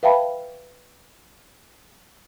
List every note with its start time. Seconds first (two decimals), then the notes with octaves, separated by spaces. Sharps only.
0.03 B4 E5 F5 G5 A5 B5